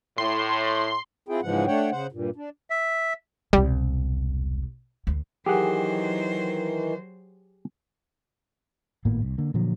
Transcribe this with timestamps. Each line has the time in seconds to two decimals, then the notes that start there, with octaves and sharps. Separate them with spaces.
0.18 A2 C6
1.29 C4 E4 F4 G#4 G5
1.42 G#2 C#3 E3 F3 G#3 F#5
1.67 A3 D4 C#5 F#5 G5
1.91 C#3 C5 F#5
2.12 G2 A#2
2.36 D4
2.70 E5
3.53 E1 C2 G3
5.07 D2
5.46 D#3 E3 F#3 G4 G#4 C5 F#5
9.05 G#1 A2 A#3 B3
9.22 C2
9.38 D3 A#3
9.54 A#2 D3 F3 F#3